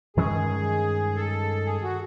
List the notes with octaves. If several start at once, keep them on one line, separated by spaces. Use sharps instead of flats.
G2 D#3 G#3 C#4 G#4
A4
G#4
F#4